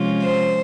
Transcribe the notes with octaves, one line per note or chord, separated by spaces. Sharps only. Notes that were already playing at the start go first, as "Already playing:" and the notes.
Already playing: C3 F3 G#3 C#4 F4
C5